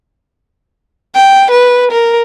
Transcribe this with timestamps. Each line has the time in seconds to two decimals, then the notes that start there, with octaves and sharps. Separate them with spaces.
1.15 G5
1.51 B4
1.91 A#4